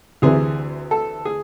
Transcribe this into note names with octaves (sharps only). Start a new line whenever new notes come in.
D2 C3 E3 G#4
A4
G#4